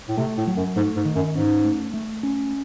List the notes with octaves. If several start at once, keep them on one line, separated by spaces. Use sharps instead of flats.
A2
C3 A3
A2
F#3
F#2
G#2 A3
G#2
D#3
F#2
G#2 C#4
A3
A3
C#4